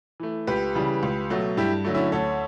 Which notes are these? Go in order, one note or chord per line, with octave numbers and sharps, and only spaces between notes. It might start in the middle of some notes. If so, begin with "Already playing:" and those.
E3 A3
C#2 G4 B4
C#3 E3 G3
C#2
B2 F#3 A3
G2 E4 G4
D3 F#3 A3
C#4 E4
D2 A4 C#5